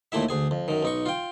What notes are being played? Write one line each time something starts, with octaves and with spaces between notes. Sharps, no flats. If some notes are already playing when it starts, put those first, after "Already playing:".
D#2 A#2 A3 E4 E5
D2 G#4 G#5
F2
F#2 D#3
B1 D#4 C#6
F4 G5